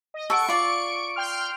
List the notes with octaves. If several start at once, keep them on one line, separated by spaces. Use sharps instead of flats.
D#5
A4 F#5 C#6 D7
F4 D5
G5 C6 F6